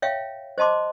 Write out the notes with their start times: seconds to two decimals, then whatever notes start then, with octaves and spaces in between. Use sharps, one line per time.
0.02 C#5 E5 F5 G5
0.58 C5 D#5 A5 C6 D6